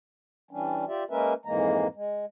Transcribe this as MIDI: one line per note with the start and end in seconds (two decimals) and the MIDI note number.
0.51 0.85 52
0.51 0.85 55
0.51 0.85 61
0.51 0.85 62
0.88 1.04 65
0.88 1.04 67
0.88 1.04 74
0.88 1.04 76
1.10 1.34 56
1.10 1.34 58
1.10 1.34 61
1.10 1.34 70
1.10 1.34 71
1.10 1.34 76
1.45 1.87 41
1.45 1.87 44
1.45 1.87 52
1.45 1.87 56
1.45 1.87 58
1.45 1.87 82
1.95 2.25 56